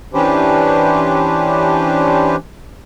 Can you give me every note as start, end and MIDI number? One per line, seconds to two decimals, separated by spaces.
0.14 2.36 52
0.14 2.36 61
0.14 2.36 62
0.14 2.36 67
0.14 2.36 71
0.14 2.36 72